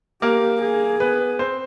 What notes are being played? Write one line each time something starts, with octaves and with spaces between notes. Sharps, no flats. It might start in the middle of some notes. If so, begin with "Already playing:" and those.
A#3 G4 A#4
G#4
B3 B4
C4 C5